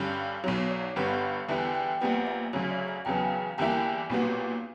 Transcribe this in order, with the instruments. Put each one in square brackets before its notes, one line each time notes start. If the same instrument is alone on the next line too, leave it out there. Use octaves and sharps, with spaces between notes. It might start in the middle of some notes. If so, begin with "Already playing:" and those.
Already playing: [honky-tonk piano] G2 D3 G3 C#4
[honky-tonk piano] B1 B2 F#3 [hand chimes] C#5
[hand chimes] C#5
D5
D5
[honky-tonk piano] G1 G2 D3 G3 B3 [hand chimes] F#5
[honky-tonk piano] E2 D3 G3 B3 E4 [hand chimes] G5
[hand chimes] G5
[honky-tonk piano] A#1 A#2 G3 B3 [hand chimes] F#5
[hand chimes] E5
[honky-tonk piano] D2 C#3 F#3 [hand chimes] C#5
[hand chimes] D5
E5
[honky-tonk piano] E2 C#3 F#3 B3 [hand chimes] G5
[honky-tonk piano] E2 D3 G3 A#3 E4 [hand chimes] G5
[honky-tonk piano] B1 A#2 G3 B3 F#4